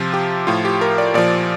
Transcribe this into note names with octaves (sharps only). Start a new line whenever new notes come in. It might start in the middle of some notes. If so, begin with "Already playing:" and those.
Already playing: C3 F3 F4
G4
A2 F3 F4
G4
A#4
D5
A#2 F3 D5